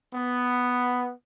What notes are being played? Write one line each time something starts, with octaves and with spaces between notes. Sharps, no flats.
B3